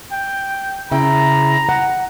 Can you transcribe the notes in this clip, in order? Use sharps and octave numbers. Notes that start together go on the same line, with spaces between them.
G5
C#3 E4 G5 A#5
F#5